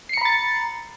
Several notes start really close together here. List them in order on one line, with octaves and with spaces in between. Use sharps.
C7 C#7 A#5 B5 A6